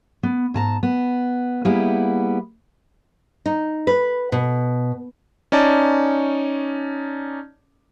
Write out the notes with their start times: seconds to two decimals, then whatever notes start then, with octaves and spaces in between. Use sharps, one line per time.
0.23 B3
0.54 G#2 A5 A#5
0.83 B3
1.65 G3 A#3 B3 E4 G#4
3.46 D#4
3.87 B4
4.32 B2
5.52 C#4 D#4 D5 A5